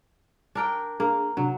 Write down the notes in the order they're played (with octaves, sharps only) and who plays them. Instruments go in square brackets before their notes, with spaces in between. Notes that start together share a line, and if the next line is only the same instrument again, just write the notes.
[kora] D4 A#4 G5
[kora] A#3 [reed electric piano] D4 G#4
[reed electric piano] C3 D4 [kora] F#3